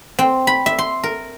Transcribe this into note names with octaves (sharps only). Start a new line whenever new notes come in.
C4
B5
E5
C6
A#4